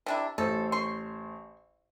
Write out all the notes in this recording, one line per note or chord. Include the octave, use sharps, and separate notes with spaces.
C3 D4 E4
A1 A4 C5
C6 C#6